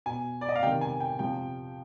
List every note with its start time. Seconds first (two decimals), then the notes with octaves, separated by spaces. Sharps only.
0.06 B2 G#5
0.41 D5
0.49 D#5
0.56 F5
0.63 C3 G5
0.66 D#3
0.81 G#5
1.00 G5
1.19 C3 F3 G5